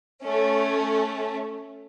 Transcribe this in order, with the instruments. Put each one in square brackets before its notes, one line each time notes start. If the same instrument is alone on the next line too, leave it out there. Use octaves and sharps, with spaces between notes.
[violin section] A3 C#4